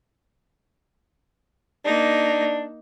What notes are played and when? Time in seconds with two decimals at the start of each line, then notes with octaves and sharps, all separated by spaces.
1.85 A#3 D4 D#4